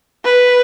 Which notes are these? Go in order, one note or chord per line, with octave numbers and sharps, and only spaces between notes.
B4